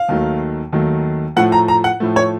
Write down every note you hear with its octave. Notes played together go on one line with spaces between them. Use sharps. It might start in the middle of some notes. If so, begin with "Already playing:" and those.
Already playing: F5
D#2 D#3 F#3 A3
D#2 D#3 F#3 A3
A2 F3 A3 F#5
A#5
A#5
F#5
A2 F3 A3
C#5